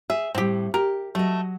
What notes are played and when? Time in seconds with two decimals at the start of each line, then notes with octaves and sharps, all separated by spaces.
0.10 G#4 E5
0.35 A2 G3 C4 G4
0.74 G4 A#4
1.15 F#3 A3 D#5